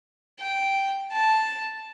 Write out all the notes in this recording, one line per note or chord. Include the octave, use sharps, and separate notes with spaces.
G5
A5